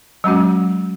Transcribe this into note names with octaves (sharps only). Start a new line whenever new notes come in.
F#3 G#3 C#4 F#4